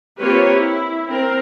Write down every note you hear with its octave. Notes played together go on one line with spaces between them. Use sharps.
A#3 C4 F4 G4 B4 C#5
E4
C4 A#4